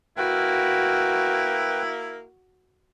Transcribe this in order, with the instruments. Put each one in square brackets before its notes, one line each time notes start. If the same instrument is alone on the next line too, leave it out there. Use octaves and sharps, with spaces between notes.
[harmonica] A#3 E4 [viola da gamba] F#4 [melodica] B4 G5